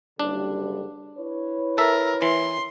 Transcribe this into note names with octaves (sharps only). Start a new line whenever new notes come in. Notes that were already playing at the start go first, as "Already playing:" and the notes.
F#1 D3 G3 D4
E4 B4 C#5
A4 A#4 E5
E3 C6